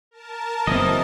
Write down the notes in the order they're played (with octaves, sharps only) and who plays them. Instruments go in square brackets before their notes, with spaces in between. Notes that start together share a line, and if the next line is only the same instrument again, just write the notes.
[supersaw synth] A#4 A5
[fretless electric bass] F#1 C4 [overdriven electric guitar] E3 [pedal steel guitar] D#5